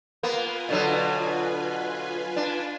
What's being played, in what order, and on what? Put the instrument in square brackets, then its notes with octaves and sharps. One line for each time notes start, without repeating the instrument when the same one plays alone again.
[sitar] A#3 B3 [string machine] F4 B4 G#5
[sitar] B2 D3 F#3
D4